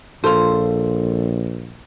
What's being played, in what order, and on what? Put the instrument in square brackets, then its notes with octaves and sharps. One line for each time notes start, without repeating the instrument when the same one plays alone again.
[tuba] A#1 [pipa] F4 C5 [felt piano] A4